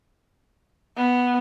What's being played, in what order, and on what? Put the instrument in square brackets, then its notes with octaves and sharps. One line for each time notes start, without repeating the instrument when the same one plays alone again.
[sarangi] B3